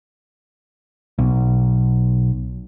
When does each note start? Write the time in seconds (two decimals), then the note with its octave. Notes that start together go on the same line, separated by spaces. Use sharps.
1.18 B1